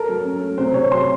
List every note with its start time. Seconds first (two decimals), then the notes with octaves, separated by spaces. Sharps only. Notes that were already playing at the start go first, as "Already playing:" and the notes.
Already playing: A4 A#4
0.08 F#3
0.25 C#4
0.41 A3
0.58 C3 C5
0.74 C3 C#5
0.91 F#3 C6